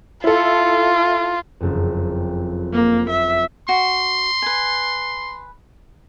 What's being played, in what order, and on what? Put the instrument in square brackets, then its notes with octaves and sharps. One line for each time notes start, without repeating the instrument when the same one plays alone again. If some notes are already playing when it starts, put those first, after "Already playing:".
[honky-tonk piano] E4 A4 [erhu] F4
[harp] F#1 F2
[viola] A#3
E5
[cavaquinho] F#4 [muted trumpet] C6
[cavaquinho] B4 G#5